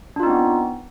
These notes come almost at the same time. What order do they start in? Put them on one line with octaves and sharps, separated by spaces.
D4 F4 D#4 C4 B3